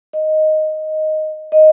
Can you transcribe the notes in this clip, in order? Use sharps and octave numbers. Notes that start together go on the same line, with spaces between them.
D#5
D#5